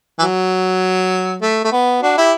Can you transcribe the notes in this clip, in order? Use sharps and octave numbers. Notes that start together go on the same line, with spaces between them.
E3
F#3
A3
A3
B3
D4 F#4
E4 G4